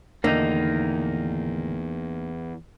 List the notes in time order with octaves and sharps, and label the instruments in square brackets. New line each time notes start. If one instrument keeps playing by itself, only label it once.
[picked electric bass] E2 [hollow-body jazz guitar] A2 D3 D#3 [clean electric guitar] A#3 D#4